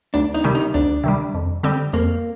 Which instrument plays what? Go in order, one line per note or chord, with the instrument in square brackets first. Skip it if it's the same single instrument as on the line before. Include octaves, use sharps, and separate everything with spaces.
[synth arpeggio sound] D2 [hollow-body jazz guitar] D4
[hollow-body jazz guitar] D#4
[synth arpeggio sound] C3 D#3 G3
[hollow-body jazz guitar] D#4
[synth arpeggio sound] D2 [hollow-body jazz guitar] D4
[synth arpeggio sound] C3 D#3 G3
F2
D3 G3 C4
[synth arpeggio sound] F2 [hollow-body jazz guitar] A#3